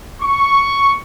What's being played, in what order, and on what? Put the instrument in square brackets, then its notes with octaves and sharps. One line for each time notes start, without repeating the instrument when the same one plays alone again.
[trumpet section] C#6